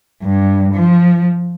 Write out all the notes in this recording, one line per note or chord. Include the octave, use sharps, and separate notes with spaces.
G2
F3